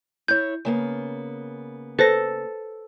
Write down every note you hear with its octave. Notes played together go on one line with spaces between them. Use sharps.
E4 C#5 G6
C#3 A#3 B3
A4 B4 C5 A#6